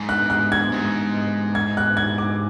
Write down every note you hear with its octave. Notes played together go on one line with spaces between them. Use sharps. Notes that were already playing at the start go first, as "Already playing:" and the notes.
Already playing: G#2
F#6
F#6
G#6
G#2
G#6
F#6
G#6
D6